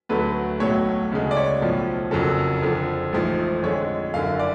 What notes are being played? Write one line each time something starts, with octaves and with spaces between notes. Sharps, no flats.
D2 D3 F#3 A3 B4
B1 A2 F#3 A3 C#5
D2 C#3 G#3
D5
C#5
B1 A2 F3
F#1 F2 C#3 F#3 A4
F2 D3 F3
A1 G#2 F3 A3
F2 D3 G#3 C#5
F#1 F#2 D3 F5
D5